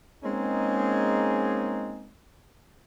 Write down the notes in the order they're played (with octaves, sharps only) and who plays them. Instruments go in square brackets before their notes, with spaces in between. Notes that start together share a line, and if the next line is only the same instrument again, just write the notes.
[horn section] G#3 A#3 C4 C#4 D#4 G#4